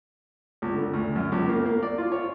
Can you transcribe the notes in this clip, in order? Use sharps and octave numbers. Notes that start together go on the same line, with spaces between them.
C#2
D3
D2
F#2
C#2
A#3
A#3
D5
F4
C#5